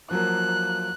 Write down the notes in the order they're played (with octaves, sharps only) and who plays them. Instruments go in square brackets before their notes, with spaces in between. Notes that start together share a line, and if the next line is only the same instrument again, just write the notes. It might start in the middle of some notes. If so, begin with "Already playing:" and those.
[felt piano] F3 F#3 A#3 [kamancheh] F#6